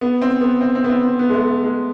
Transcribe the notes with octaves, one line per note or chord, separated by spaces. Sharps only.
B3
C4
B3
C4
C4
B3
C4
C4
B3
G#3
A3
A3
G#3